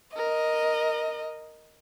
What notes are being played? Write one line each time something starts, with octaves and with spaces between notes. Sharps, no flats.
A#4 D#5